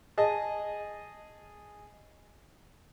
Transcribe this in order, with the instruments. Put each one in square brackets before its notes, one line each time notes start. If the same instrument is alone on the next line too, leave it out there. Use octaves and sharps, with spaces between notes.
[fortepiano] G#4 D#5 A5